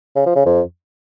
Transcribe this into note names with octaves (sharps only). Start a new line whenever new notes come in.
C#3
F3
C#3
F2